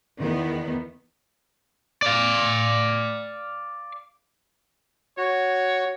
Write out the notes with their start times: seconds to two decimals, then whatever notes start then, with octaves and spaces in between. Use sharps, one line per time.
0.18 E2 D#3 B3
2.02 D5 F5
5.18 F#4 C#5